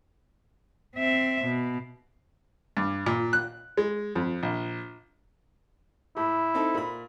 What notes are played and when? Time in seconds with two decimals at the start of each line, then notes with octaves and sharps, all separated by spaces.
0.96 C4 E5
1.44 B2
2.77 G2
3.06 A#2
3.33 F#6
3.77 G#3
4.16 F2
4.43 A#1
6.17 A2 E4
6.54 C4 D#4 A4
6.74 A#2 B5